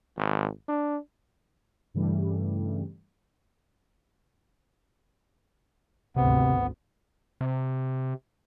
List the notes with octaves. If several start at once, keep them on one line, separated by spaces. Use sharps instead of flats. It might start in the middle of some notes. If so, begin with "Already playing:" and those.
G#1
D4
G2 C#3 E3 G3 A3
G#1 D2 C3 B3
C3